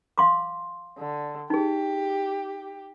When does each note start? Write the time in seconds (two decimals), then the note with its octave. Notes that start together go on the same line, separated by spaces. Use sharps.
0.18 F5 C6 D6
0.99 D3
1.50 D#4 G4 G#4